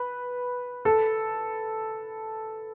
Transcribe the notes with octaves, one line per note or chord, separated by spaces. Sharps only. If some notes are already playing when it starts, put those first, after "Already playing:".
Already playing: B4
A4